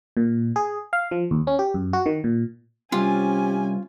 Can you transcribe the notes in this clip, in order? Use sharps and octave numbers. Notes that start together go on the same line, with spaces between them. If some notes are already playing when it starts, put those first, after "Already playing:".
A#2
G#4
F5
F3
D#2
C#4
G4
F#2
F#4
D#3
A#2
C3 G3 C4 C#4 F4 G4 G#5